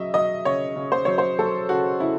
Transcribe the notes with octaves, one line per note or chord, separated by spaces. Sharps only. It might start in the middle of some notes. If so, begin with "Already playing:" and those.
Already playing: C#3 F#3 D#5 E5
F#3 D#5
C#3 C#5
C#3
C5
F#3 C#5
C5
F#3 A4
C#3 F#4
C#3 E4